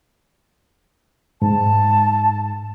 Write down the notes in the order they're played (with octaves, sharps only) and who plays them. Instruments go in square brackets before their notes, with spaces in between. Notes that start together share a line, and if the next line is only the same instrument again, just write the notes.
[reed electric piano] G#2 [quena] A5